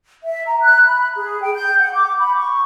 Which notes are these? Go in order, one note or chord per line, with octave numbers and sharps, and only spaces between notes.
E5
A#5
F#6
B5
G#4
G5
G6
F#5
D6
B5
C#6